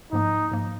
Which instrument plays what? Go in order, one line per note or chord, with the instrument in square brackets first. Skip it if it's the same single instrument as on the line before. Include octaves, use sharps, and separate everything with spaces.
[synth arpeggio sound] G#2 F3 A#3 [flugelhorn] D#4
[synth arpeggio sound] G#2 F3 A#3